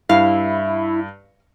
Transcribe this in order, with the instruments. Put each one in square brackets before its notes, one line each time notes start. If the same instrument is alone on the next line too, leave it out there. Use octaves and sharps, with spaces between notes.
[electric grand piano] G2 [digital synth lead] E4 [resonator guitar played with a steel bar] F5